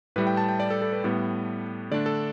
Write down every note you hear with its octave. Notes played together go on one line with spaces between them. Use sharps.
A2 G3 E4 B4
G5
A5
G5
D5
A4
A4
B4
A2 G3 B3
D3 A3 D4 D5
A4